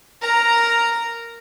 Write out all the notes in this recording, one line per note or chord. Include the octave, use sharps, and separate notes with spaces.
A#4 A#5